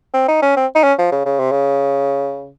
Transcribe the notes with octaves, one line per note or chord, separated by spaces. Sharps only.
C4
D#4
C#4
C4
D#4
C#4
F3
C#3
C#3
C3
C#3